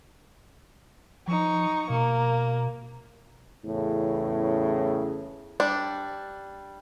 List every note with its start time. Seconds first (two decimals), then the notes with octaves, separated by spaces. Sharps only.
1.27 F3 D#4 C#6
1.90 B2 A#3
3.66 E2 A2 C#3
5.60 G3 D4